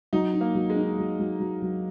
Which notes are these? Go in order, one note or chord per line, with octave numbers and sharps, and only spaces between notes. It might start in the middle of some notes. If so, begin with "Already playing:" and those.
F#3 D#4
D#4
A#3
F#3
G#3
D#4
F#3
F#3
F#3
F#3